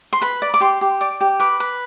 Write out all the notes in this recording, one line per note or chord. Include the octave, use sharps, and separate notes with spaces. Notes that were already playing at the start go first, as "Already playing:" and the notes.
C6
B4 B5
D5
D6
G4 C6
G4
D5 D6
G4
B4 D6
B4